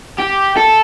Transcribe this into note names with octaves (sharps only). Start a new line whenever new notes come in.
G4
A4